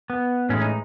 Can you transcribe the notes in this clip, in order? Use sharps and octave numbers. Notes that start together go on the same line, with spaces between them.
B3
A2 E3 G#3 C#4
D#4